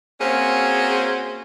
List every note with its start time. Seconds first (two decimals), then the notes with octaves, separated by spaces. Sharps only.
0.21 A#3 C4 C#4 F#4 G#4 C5